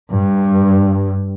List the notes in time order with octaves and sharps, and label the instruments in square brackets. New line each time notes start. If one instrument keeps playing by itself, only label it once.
[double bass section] G2